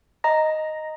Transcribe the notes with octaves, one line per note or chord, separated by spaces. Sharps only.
D#5 A#5 A#6